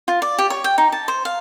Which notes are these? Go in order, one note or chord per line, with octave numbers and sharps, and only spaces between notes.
F4
D5
G4
C#5
G5
D#4
A5
C5
F5